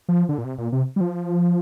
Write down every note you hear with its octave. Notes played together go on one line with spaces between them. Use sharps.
F3
D3
A#2
C3
A#2
C3
G3
F3